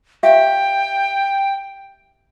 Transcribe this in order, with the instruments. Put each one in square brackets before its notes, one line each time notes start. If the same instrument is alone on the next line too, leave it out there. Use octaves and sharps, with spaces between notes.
[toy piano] G4 E5 F5 [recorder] G5